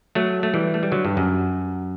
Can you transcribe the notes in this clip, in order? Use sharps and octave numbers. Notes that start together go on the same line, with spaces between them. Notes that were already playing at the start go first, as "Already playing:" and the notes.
F#3 A3
A3
E3 G3
A3
G3
D3 F#3
G2
F#2